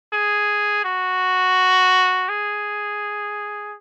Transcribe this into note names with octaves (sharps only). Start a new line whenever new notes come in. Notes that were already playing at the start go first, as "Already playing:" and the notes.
G#4
F#4
G#4